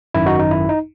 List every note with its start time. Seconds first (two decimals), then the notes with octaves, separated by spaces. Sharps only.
0.14 G#1 F#2 D#3 E4
0.26 D#4 F#4
0.39 D#4
0.51 E4
0.69 D#4